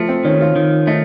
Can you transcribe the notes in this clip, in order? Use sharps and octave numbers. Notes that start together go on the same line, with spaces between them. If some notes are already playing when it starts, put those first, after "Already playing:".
Already playing: F3 A3
C4
D#3 C#4
F4
D#3
A3 D#4